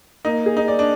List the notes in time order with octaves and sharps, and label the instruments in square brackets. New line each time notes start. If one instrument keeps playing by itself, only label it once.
[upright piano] A#3 [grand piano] D#4
[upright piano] G#4
[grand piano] D#4
[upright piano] D5
[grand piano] D4